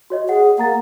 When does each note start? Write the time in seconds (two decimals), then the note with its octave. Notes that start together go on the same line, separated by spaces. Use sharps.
0.10 F#4 C#5 D#5
0.29 G#4 F#5
0.58 A#3 F#5 A#5 A6